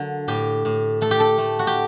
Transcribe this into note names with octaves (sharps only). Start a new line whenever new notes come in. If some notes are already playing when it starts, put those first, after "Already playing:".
Already playing: D3 F#3 A#3
A2 G4
A2
A3 A4
G4
A4
A3
F#4
G4